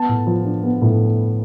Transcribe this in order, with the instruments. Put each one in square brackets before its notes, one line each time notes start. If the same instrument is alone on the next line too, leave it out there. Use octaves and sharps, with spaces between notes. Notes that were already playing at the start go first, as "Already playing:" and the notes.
Already playing: [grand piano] B3 A5
A2
F3
D4
B3
A2